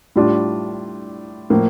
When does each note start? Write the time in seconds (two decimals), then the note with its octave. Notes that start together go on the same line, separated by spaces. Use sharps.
0.16 A2 G3 D4 F4
1.50 A2 F3 A#3